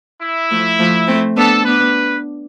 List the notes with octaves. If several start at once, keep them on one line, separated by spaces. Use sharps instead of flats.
E4
F3 A3
F3 A3
A3 C4
B3 D4 A4
B3 D4 B4